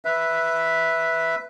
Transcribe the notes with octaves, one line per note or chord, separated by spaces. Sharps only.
B4 E5